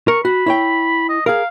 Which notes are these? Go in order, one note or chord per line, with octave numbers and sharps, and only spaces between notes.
A#4 C#6
F#4 B5
E4 C#5 G5
D#5
G#4 A#4 F5